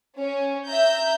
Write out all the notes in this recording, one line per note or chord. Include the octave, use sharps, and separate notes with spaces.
C#4
E5 A#5 G6